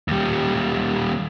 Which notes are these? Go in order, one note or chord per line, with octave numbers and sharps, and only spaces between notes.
D#2 G3